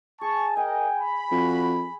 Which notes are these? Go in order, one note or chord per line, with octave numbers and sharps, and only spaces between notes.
G#4 A5 C#6
A#4 D#5 G5 G#5
B5
F2 F#4